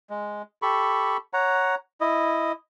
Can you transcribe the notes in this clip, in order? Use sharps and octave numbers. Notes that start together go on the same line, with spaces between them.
G#3
G4 A4 B5 C#6
C#5 F#5 A#5
E4 D#5